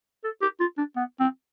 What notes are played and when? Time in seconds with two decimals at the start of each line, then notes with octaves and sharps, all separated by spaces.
0.24 A4
0.42 G4
0.60 F4
0.77 D4
0.96 B3
1.20 C4